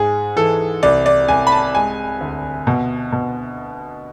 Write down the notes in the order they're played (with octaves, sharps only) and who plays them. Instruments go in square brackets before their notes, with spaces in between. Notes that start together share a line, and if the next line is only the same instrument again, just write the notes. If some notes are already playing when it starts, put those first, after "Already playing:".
Already playing: [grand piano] G#2 G#4
E3 A4
C2 D5
D5
C2 G#5
B5
A5
G#3 G#5
D2
B2
B2